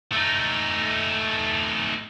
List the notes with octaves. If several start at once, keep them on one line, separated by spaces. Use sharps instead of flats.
A3 D#4